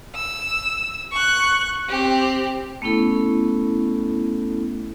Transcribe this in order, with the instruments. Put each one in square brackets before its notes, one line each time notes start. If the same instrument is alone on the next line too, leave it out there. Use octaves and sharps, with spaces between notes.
[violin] E6
C#6 F#6
C4 G4
[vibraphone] A3 B3 C#4 E4 A4